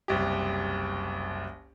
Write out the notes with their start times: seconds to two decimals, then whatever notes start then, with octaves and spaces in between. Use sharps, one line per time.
0.08 F#1 C2 G4